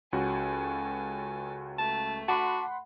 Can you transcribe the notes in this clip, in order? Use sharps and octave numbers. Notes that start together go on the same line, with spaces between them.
C#2 C#4 F#4 A4 G#5
A3 A5
F#4 F#5 A5 B5 C6 D6